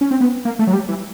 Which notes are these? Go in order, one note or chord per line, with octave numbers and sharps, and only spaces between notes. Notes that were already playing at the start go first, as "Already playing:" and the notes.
C#4
C4
B3
A#3
A3
F#3
G3
E3